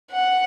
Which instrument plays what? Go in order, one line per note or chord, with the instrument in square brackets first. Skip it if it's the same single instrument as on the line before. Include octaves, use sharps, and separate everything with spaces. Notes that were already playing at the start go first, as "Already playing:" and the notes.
[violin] F#5